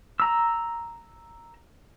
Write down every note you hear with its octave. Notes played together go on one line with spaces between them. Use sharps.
A#5 E6